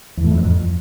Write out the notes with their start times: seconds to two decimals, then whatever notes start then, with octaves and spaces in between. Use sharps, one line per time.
0.17 E2
0.24 A2
0.31 F2
0.38 F#2
0.44 F2